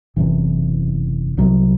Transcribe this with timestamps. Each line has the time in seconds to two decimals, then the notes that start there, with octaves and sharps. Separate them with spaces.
0.16 F#1 E2 C3 E3
1.37 C2 C3 F#3